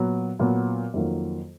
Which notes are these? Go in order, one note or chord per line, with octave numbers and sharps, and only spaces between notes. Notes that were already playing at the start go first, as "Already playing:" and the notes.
Already playing: A#2 F#3 B3
A#2 F#3 B3
F2 D#3 F#3 A#3 F4